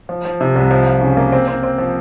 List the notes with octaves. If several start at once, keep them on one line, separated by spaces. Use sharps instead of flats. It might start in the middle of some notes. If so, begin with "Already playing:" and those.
F3
F3
C3
C2
F3
F3
C#3
A#3
C4
C4
C4
F3